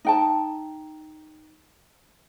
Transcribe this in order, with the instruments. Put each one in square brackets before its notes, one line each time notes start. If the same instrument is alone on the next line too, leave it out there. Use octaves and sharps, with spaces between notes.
[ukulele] D#4 G5 A5